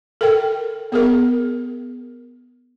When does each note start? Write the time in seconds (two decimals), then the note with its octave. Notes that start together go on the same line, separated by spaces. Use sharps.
0.21 A4 A#4 G5
0.92 B3 G#4 A#4